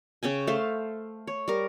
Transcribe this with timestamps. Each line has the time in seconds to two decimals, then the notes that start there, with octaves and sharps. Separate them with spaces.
0.23 C#3 C#4 G5 G#5
0.47 A3 C5 F5
1.27 C#5
1.48 G3 A#4